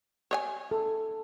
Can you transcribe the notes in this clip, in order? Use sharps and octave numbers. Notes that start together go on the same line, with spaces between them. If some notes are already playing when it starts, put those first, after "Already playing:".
C#5 D#5 G#5
A4